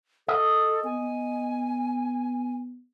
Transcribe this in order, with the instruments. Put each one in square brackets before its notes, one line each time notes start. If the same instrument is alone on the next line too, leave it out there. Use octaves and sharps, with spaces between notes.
[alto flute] A4 [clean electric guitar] D#5
[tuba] B3 [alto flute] G#5